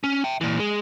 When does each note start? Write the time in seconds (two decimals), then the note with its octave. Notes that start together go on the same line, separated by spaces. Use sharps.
0.04 C#4
0.24 E5 G5
0.41 A#2 E3
0.60 G#3